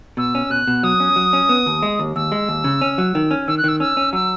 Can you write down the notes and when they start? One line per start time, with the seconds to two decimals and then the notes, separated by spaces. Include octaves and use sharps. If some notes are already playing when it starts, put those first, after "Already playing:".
0.17 B2 E6
0.35 C#4
0.50 B2 F#6
0.67 B2
0.83 F#3 D#6
1.00 C#4
1.16 F#3
1.33 C#4
1.49 B3
1.66 D#2
1.82 G#3
2.00 D#2
2.15 D#2 E6
2.32 G#3
2.49 D#2
2.64 C#3
2.81 C#4
2.98 F#3
3.15 D#3
3.31 C#4
3.47 D#3 E6
3.58 F#6
3.64 D#3 E6
3.80 C#4 E6
3.97 C#4
4.13 F#3 E6